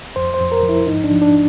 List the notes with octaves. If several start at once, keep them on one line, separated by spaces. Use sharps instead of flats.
F2 C5
C5
F2
A#4
F3
E4
G#2 D#4
D4
F3
D4